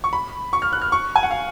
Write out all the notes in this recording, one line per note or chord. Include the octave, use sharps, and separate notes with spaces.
C#6
B5
C#6
F6
F#6
F6
C#6
G#5
F#5
F5